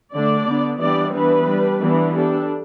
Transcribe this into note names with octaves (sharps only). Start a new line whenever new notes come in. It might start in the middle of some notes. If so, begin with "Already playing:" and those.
D3 A3 D4 D5
D3 B3 D4
E3 G3 B3 D4 D5
E3 B3 D4 B4
G3 D4
E3 B3 D4
G3 D4 A4